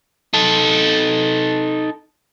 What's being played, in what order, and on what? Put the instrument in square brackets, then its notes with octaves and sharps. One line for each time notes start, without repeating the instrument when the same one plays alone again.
[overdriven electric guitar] D#4 A4